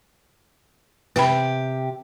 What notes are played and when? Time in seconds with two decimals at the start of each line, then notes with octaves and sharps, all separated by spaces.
1.16 C3 G4 B4 G5 B5